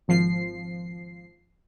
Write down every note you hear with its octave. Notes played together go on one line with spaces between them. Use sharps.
G#1 F3 C7